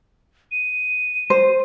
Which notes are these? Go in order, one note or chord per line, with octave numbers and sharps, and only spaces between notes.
D#7
C5